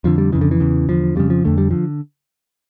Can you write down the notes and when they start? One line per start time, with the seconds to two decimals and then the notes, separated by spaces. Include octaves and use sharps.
0.04 F2 D3 F3
0.18 G3
0.32 F2 C#3 E3
0.41 D3
0.51 E3
0.60 E2 C#3
0.88 E2 D3 F3
1.16 F2 C#3 G3
1.30 F3
1.44 F2 D3 A3
1.58 G3
1.71 D3 F3